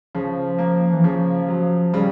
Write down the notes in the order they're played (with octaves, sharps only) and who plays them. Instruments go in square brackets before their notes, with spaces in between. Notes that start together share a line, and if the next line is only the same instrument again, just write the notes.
[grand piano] C#3 [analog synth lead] F3
[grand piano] A#3
[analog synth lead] E3
[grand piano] C#3 [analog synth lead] F3
[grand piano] F#3
[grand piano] C#3 [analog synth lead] G3